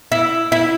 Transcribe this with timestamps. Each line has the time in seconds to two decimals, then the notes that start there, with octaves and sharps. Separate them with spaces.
0.12 E4
0.52 E4